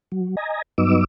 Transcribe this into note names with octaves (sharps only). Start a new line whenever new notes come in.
F#3
D#5 G#5 A#5
G2 F#3 B3 D#4 D6 E6